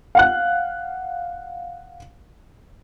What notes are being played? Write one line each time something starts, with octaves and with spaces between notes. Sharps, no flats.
F5 F#5 F#6